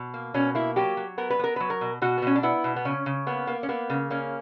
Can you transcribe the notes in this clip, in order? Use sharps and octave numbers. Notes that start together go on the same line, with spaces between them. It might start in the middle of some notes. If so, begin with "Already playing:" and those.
Already playing: B2
A#3
B2 C#4
A#3 E4
F#3 G4
F#3
B3 A#4
B4
B3 A#4
F#3 B4
A#4
B2
B2 F#4
B3
B2 C#4
D4
B3 E4
B2
B3
C#3 C#4
C#3
A#3 B3
A#3
C#4
A#3 B3
C#3
A#3 C#4